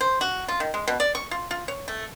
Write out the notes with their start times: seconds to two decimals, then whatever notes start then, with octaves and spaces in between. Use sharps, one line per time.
0.01 C5
0.21 F#4
0.48 F4
0.60 D#3
0.74 G#3
0.87 B2
1.00 D5
1.15 C#6
1.31 F4
1.51 F4
1.68 C#5
1.88 A3